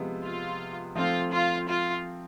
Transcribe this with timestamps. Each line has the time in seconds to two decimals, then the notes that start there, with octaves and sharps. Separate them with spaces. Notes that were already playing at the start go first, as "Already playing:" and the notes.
Already playing: C3 F3 G#3 B3
0.24 F4
0.96 F3 A3 C4 F4
1.32 F4
1.68 F4